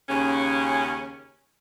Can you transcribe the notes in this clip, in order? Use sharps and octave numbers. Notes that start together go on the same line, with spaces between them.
D#2 C#3 C#4